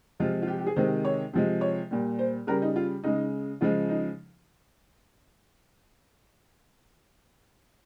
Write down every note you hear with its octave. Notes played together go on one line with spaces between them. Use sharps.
C3 F3 G#3 F4
F4
G4
G4
G#4
C3 D#3 G#3 C5
C#5
C3 F3 G#3
C#5
A#2 G3
C5
C#3 G3 A#4
D#4
F4
C#3 G#3 D#4
C#3 F3 G#3 F4
D#4